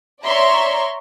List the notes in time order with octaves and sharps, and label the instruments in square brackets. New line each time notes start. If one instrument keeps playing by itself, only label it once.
[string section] C#5 D5 E5 A#5 C6 C#6